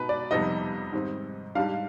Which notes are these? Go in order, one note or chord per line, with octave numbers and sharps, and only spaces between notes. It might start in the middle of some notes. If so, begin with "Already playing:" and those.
Already playing: B2 B3 D#4 B4
D5
F2 C3 G3 B3 D#4 D#5
G#2 D#3 G3 C4
G#2 G3 D4 F5